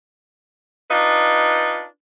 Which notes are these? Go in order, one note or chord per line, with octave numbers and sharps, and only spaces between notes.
D4 D#4 F4 B4